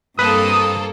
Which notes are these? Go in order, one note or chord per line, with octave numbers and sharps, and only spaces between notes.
G2 A#3 C4 A4 B4 D#6